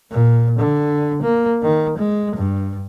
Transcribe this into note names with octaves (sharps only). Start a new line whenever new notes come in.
A#2
D3
A#3
D#3
G#3
G2